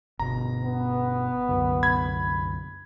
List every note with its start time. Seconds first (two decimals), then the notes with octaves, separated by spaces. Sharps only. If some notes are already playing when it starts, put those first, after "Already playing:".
0.19 G1 B2 A#5
0.63 B3
1.48 C2 F#2 D3
1.83 B5 G#6